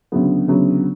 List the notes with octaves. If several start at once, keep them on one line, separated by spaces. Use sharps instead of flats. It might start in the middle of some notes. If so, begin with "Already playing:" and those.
D2 C#3 F#3 B3
D2 C#3 F#3 B3